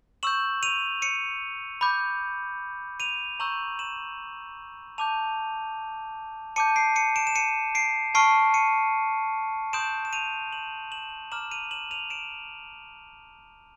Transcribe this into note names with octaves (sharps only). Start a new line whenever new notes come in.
C#6 E6 G6 E7 F#7
D#7 F7
C#7 D#7
B5 D6 G6
D#7 F7
A#5 C#6 E6 G6 E7 F#7
E7 F#7
A5 D6 G6 D#7 F7
A5 D6 G6 C#7 D#7
C7 D7
C#7 D#7
D7 E7
E7
C#7 D#7
C7 D7
A5 C#6 F6 C7 D7
C#7 D#7
C6 D#6 G6 D7 E7
E7
D#7 F7
E7 F#7
E7 F#7
A#5 D6 F6 E7 F#7
D#7 F7
E7 F#7
D#7 F7
D7 E7